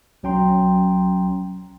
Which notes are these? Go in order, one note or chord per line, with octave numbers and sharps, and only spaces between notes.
B1 F#3 C#4 G5 A#5 C6